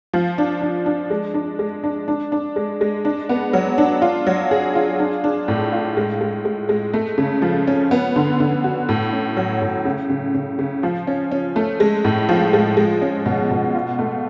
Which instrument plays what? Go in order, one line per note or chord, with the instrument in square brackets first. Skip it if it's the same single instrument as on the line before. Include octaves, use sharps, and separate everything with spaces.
[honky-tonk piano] F3
D4
D4
D4
G#3
D4
G#3
D4
D4
D4
G#3
G#3
D4
B3
F#3
D4
F4
F#3
G#4
F4
D4
D4
A2
F4
G#3
G#3
G#3
G#3
A3
C#3
F3
C#4
B3
D3
D3
F#4
A2
C#4
F#3
A2
C#3
C#3
C#3
C#3
F3
C#4
C#4
A3
G#3
A2
F3
G#3
G#3
C#4
B2
B2
F4
A3